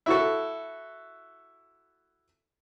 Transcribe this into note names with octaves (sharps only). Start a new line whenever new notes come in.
E4 F#4 A4